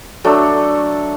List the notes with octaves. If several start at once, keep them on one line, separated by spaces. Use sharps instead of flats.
F#3 A3 D4 A4